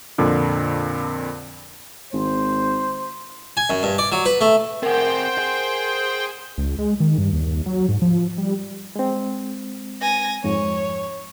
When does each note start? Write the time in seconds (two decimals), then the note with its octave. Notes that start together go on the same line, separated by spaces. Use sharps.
0.18 F2 A#2 D3
2.13 G#1 C5
3.57 G#5
3.70 F#2
3.83 G2
3.98 D5
4.12 F#3
4.25 B4
4.41 A3
4.83 C4 G#4 A#4 C5 F#5 G5
5.38 G#4
6.58 C#2
6.79 G#3
7.00 D#3
7.18 G2
7.33 D#2
7.66 F#3
7.89 G#2
8.02 F3
8.38 G3
8.96 G#3 C4
10.02 G#5 A#6
10.44 F2 G#2 C#5